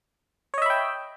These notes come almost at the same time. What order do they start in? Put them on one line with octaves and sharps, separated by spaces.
C#5 D#5 E5 B5 G5